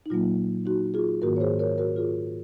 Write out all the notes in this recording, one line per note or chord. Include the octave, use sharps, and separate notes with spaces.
D#4
A#2 F#3 A#3 F4
D#4 F#4
F4 G#4
G#2 D#3 A#3 F#4 A#4
C#5
G#4 C5
A#4 C#5
F#4 A#4
F4 G#4